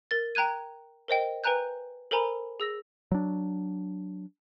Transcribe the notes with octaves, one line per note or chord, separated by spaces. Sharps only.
A#4 A6
G5 A#5 F#6 G#6 D#7
A#4 C5 D#5 G5
B4 G5 G#5 A#5 F#6 G6
A4 A#4 C5 G#5 A#5 B5
G#4 E6 A#6
F#3 D4